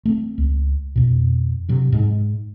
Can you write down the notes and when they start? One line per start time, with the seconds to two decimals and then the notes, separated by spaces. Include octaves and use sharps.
0.05 A3 C4
0.38 C#2
0.96 F2 B2
1.69 G2 C3 F#3
1.92 G#2 G#3